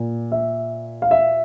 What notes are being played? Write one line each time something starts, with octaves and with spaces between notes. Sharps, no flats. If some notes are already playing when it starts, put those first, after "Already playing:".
Already playing: A#2
E5
F5
E5